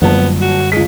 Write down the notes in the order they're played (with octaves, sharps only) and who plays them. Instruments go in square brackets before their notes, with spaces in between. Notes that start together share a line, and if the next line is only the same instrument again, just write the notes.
[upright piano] F#1 F3 A5 [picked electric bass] F#2 D3 G3 [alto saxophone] B3
[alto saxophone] F#4
[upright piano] C#2 B6 [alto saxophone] G#3